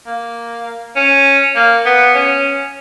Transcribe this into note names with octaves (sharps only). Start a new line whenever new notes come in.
A#3
C#4
A#3
B3
C#4